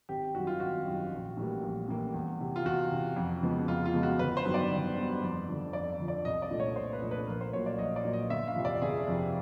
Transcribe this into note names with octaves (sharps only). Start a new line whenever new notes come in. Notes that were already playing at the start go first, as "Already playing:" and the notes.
G#1 G4
F#2 D#3 G3 F#4
F4
G#1 F#4
F#2 D#3 G3
A#1
A2 E3 G3 A#3
A#1
A2 E3 G3 A#3
E2
C3 E3
F4
E2 F#4
C3 E3
F2
C#3 F3 G#3 B3
F2 F4
F4
C#3 F3 G#3 B3
F#4
G1 B4
C5
G2 D#3 F#3 B3
D5
G1
G2 D#3 F#3 B3
F2
D3 F3
F2 D5
D3 F3
D5
C2 D#5
D5
A#2 F3 A3 D4
C#5
C2 C5
B4
A#2 F3 A3 D4
B4
A#1 A#4
C5
A#2 F#3 A#3 C#5
D5
A#1 D#5
D5
A#2 F#3 A#3
D#5
G1 E5
F5
F2 C3 F3
D5
G1 G#4
F2 C3 F3